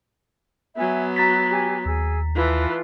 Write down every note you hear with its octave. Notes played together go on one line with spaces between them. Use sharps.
F#3 B3 E5 G#5
F#4 A#5 A6 B6
G4 G#5
D#2 G#4 E6
E3 F4 A4 B4